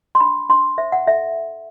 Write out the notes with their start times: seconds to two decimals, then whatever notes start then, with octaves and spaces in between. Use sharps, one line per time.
0.15 C6
0.20 D4 B5
0.49 D4 C6
0.78 C5 E5
0.92 F#5
1.07 A4 E5